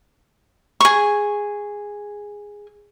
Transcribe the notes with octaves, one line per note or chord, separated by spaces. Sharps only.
G#4 C#6